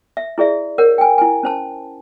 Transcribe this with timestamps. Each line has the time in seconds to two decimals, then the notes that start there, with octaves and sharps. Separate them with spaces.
0.17 E5
0.38 E4 G#4 D5 E5
0.78 A#4 C#5 F#5
0.98 G5 G#5
1.18 E4 G#5
1.43 C#4 C5 A5